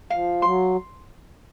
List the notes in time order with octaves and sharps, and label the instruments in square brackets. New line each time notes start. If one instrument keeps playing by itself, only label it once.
[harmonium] F3 [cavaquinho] F5
[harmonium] F#3 [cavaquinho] C6